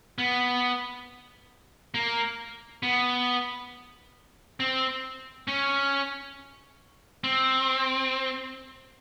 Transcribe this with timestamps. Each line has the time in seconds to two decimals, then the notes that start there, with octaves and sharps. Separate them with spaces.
0.18 B3
1.94 A#3
2.83 B3
4.60 C4
5.48 C#4
7.24 C4